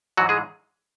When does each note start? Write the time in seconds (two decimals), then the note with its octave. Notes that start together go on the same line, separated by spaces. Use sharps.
0.17 G#2 E3 F#3 F#4
0.29 G#3 G#4